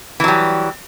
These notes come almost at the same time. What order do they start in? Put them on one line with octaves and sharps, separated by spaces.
E3 F#3 G3